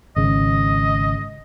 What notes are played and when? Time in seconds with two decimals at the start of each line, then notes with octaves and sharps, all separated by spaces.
0.16 G#1 C#3 D#5